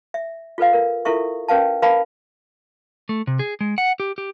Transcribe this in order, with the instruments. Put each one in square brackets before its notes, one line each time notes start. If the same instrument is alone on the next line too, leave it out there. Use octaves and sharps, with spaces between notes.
[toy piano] E5
F4 A4 B4 F5
A#4
E4 F4 A4 A#4 E5 C#6
C#4 A#4 B4 F5 A5
A#4 B4 F5 A5 B5
[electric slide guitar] A3
C3
G#4
G#3
F#5
G4
G4